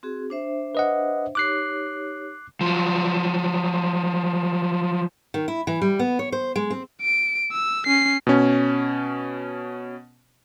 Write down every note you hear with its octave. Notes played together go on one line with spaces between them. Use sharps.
C4 F#4 G#4
D4 C5 E5
B4 D#5 F#5
D#4 G4 C#5 D6 F#6 C7
F3 F#3
D#3
E4
E3
G3
B3
C#5
C5
G#3
C4
D7
E6
C#4 C7
B2 C#4